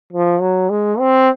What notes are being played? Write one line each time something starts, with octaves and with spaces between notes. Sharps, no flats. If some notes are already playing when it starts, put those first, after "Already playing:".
F3
F#3
G#3
C4